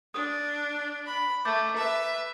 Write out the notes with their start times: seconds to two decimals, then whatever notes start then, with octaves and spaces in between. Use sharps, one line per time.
0.14 D4 D#6
1.06 B5
1.45 A3 D6 G6 A6
1.76 B4 E5